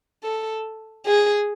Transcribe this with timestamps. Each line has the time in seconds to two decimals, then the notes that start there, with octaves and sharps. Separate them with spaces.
0.24 A4
1.06 G#4